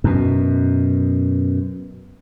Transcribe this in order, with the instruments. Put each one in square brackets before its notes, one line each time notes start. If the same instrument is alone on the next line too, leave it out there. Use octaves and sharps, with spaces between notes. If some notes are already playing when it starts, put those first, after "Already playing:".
[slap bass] F#2 B2